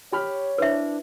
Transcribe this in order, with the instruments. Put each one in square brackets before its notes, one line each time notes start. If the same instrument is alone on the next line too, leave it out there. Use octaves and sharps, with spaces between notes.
[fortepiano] G4 B5 F6 [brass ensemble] C#5
[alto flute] D4 [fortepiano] E4 [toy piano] B4 C5 E5